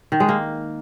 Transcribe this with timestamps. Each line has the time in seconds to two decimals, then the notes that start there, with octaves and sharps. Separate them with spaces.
0.12 D#3
0.20 G#3
0.29 A#3